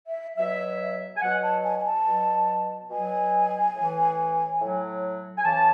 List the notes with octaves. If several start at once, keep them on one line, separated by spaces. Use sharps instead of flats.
E5
B2 F#3 E5
G#5
B2 F#3 F#5
A5
G#5
G#5
A5
B2 F#3
B2 F#3 G#5
A2 E3
A2 F#3
G#5
C#3 E3 A5